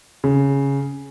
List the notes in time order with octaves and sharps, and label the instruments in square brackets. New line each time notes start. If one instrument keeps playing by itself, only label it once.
[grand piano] C#3